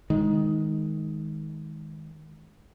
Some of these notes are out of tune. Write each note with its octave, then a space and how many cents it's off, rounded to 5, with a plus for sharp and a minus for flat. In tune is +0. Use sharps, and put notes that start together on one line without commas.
D#3 +15 G#3 +0